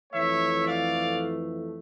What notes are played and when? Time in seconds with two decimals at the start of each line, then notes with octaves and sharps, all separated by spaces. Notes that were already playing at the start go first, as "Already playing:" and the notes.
0.12 F2 E3 A3 C#5 E5
0.65 D5 F5